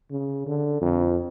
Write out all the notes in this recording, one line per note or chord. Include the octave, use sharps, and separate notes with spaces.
C#3
D3
F2